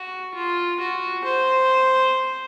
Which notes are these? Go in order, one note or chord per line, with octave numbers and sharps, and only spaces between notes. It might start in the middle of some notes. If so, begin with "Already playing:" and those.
Already playing: F#4
F4
F#4
C5